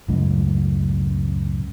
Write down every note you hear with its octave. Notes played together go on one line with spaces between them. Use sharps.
C#2 F#2 A2